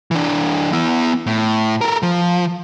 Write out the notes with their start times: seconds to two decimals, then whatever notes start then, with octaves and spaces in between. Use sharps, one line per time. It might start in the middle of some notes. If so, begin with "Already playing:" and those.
0.11 E3 D4
0.73 B3 E4
1.27 A2
1.81 A4 A#4
2.03 F3